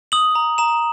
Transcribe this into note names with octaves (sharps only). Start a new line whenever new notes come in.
D#6 F#7
A#5
A#5 E7